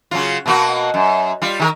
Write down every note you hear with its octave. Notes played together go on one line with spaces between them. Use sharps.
C#3 F#3 F4
B2 A#3 F#4
F#2
G3 F4
D#3 G4 A#4